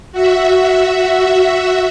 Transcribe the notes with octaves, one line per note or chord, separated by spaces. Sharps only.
F#4 E5